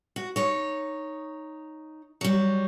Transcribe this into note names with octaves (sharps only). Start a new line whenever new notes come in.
F#4
D#4 C#5
F#3 G3